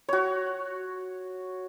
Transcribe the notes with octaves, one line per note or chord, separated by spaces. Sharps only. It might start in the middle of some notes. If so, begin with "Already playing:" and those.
F#4 C#5